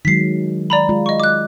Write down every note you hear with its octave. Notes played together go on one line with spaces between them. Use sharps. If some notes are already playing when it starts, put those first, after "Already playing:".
D#3 F#3 G#3 B6 C7
D5 A#5 B5
G#3 F4
D#5 C#6
D6 F#6